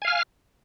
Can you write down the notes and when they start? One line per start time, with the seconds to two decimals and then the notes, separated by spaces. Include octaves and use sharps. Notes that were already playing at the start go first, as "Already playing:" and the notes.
0.02 G#5
0.05 F5
0.07 F6